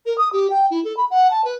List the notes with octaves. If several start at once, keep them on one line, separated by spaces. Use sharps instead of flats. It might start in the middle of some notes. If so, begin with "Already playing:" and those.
A#4
D#6
G4
G5
E4
A4
B5
F#5
A5
B4